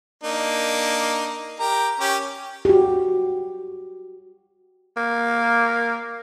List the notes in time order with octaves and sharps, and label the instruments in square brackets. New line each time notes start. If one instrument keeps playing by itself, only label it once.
[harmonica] A#3 D4 D#4
G4 A#4
C#4 G4
[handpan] F#4 G4
[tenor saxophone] A#3